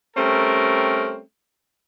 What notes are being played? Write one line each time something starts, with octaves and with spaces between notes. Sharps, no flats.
G3 A3 C4 C#4 A#4